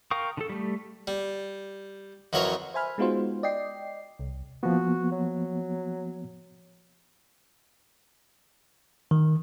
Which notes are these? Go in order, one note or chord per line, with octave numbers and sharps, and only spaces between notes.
A#4 F5 G5 C#6 D#6
D3 A4
G3 A3
G3
F2 E3 F#3 A#4 C#5
C5 E5 G#5 B5 F6
G#3 B3 D#4 F4 F#4 C5
D5 D#5 G5 C7
C2
F3 A#3 B3 F#4
F#3
D#3